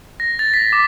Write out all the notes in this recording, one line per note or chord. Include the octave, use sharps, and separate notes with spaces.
A#6
A6
B6
D6